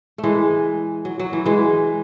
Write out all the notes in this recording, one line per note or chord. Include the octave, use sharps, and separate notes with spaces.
A3
E3 G#3
F#3
F#3
E3
E3 G#3